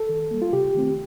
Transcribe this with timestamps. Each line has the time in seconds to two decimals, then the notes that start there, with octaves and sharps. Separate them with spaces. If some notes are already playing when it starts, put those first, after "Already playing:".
Already playing: A4
0.09 D#3
0.31 G3 A#3
0.42 F4
0.53 C3 G4
0.75 D#3 A3 C4